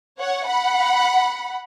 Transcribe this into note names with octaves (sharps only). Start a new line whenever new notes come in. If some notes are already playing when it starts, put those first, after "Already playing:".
C#5 F#5
F#5 B5